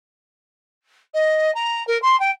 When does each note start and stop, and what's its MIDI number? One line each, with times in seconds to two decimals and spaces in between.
1.14 1.54 75
1.55 1.85 82
1.87 2.00 70
2.02 2.19 84
2.20 2.31 79